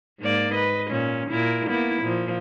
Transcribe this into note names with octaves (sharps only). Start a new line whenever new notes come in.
G#2 A#3 D5
B4 D#5
A#2 C#4
A#2 E4 A#4
A#3 B3 E4
A#2 F3